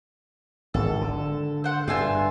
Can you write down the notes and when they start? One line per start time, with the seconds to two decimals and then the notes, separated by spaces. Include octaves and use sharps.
0.74 G#1 A4
1.01 D3
1.64 C5 F#5
1.88 G2 F4 E5 G#5